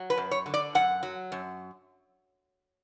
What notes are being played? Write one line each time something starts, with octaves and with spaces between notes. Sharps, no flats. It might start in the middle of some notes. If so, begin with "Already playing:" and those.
Already playing: F#3
B4
F#2
C#5
D3
D5
F#2 F#5
F#3
F#2